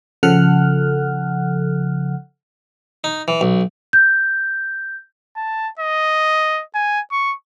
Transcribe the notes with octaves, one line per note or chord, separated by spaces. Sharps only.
C#3 F3 A4 F#5 F6 F#6
D#4
E3
B1
G6
A5
D#5
G#5
C#6